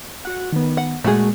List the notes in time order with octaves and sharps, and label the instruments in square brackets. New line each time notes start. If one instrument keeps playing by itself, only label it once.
[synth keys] F#4 F#5
D#3 B3
[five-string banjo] F#5
[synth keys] A#2 G#3 [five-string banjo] A3 F#4 G#4